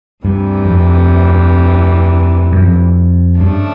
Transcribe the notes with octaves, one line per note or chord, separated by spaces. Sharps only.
D2 G2 C3 E3 G3
F2
F#2
F2
G2 C#3 F3 A3 D4